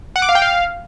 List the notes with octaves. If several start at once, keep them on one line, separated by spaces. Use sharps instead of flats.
F#5
D6
F5
G5
F5